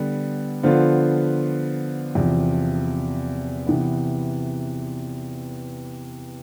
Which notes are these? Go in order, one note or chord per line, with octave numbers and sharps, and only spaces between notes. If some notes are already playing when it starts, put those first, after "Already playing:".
Already playing: D3 G3 B3
D3 F3 B3 F4 C5
E2 C3 F3
C3 E3 B3